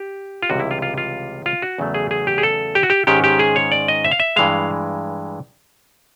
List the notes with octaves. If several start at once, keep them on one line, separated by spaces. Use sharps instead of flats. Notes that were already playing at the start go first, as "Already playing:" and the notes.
Already playing: G4
F4
C#2 C3 E3 G3 F#4
E4
F4
F4
F4
F4
F#4
E2 C#3 F#3 A3
G#4
G#4
G4
G#4
A4
G4
F#4
G4
G#2 D#3 G#3 C#4 G4
G4
G#4
C#5
D5
D#5
E5
F5
E5
G2 E3 G#3 F5